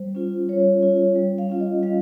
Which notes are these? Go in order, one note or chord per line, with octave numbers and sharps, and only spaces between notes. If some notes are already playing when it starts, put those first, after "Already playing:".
Already playing: G3 C5
C#4 F4
G3 C#5
C#4 F4
G3
F5
C#4 F4
D#5
G3 F5